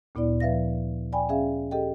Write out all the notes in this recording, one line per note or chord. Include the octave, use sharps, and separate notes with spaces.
D2 A#2 B3 E4 D5
F3 B4 E5 F5 A#6
D5 G5 G#5 B5
C#4 G#4 E5 F5
G4 A4 D#5 G5